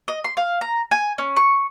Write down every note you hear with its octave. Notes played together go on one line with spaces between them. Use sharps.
D#5
C6
F5
A#5
G#5
C#4
C#6